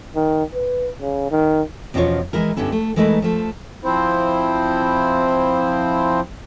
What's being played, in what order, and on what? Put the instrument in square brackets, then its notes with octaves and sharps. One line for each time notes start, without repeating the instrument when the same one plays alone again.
[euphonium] D#3
B4
C#3
D#3
[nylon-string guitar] E2 B2 F3 C#4 F4 C#5
E3 G#3 E4 A#4
G2 D3 B3 C#4 E4
A3
E3 G#3 A3 D#4 A#4 B4
F3 A3
[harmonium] F3 C4 E4 C5